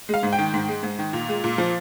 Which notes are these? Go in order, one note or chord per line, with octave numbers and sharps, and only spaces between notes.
G#3 F5
G#2
G5
D#3
G#2
G#3
G#2
D#3
A#2
G#3
A#2
F3